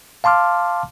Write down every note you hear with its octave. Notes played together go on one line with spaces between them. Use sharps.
F5 A5 C6 D6 F6